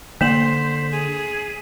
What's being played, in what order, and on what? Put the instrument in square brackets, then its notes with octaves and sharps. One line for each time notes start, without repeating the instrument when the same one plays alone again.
[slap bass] D3 [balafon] A#3 [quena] C5 [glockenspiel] B6 E7 F#7
[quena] G#4